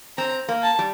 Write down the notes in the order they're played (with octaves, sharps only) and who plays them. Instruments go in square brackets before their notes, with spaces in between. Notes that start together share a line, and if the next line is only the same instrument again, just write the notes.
[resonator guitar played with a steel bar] C4 [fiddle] A#5
[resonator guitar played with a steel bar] A#3
[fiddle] A5
[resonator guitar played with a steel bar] G3